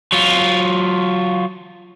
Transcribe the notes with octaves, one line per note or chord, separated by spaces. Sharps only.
F#3 F4